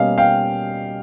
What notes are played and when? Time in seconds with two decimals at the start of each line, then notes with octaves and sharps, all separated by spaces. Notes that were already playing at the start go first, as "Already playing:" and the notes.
Already playing: B2 G3 A#3 C#4 D#5 F5
0.18 F5 G5